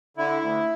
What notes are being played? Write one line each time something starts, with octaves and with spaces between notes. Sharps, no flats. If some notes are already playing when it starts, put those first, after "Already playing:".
D3 E4
D2